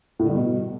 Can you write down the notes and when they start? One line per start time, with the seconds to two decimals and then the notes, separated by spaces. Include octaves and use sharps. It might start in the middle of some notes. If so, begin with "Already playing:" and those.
0.19 A2
0.25 D3
0.30 G2
0.35 B2